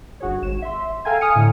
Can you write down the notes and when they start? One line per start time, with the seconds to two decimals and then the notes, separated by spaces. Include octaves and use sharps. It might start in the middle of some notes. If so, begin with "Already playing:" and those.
0.20 G1 F#4 G#4 C#5
0.42 G#1 E7
0.62 E5 C6
1.05 A4 F5 G5 G#5 A#5 G#6
1.21 G#5 D#6 F6 C#7 D#7
1.36 A2 D3